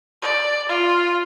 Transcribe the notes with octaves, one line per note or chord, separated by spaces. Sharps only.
D5
F4